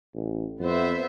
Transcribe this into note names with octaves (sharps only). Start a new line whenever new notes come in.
A1
F2 B3 C5 E5